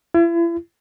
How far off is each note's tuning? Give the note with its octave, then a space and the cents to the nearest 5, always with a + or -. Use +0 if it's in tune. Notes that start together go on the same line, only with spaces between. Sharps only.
E4 +40